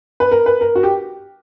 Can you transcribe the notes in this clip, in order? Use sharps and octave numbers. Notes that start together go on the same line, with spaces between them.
B4
A#4
B4
A#4
F#4
G4